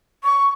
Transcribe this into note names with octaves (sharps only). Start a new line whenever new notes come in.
C#6